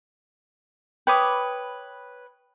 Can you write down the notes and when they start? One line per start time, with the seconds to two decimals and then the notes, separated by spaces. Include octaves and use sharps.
1.07 B4 C#5 G5 B5 D6 D#6